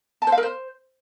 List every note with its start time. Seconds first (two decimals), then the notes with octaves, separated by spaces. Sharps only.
0.22 A5
0.27 C5
0.32 F5
0.38 A#4
0.43 C5